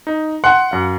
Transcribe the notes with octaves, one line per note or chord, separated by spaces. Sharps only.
D#4
F#5 C6
F#2 F5